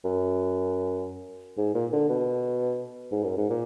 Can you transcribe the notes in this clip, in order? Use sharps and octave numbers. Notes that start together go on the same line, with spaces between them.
F#2
G#2
A#2
D3
B2
G#2
F#2
G#2
A#2